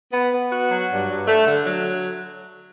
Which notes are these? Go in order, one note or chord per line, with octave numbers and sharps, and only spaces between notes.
B3
B3
F#4
F#3
G2
G2
A3
D3
F#3